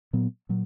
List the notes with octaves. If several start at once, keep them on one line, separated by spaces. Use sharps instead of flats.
A#2 F#3 B3
A#2 F#3